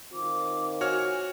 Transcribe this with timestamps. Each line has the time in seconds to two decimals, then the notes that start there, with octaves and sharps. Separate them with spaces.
0.13 D#3 C4 F4 D6
0.81 F#4 C#5 G#5 F6